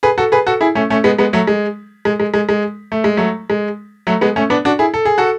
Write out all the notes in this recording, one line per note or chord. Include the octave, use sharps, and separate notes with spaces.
G#4 B4
F#4 A4
G#4 B4
F#4 A4
E4 G#4
A3 C#4
A3 C#4
G#3 B3
G#3 B3
F#3 A3
G#3
G#3
G#3
G#3
G#3
A3
G#3
F#3 A3
G#3
F#3 A3
G#3 B3
A3 C#4
B3 D4
D4 F#4
E4 G#4
A4
G#4
F#4 A4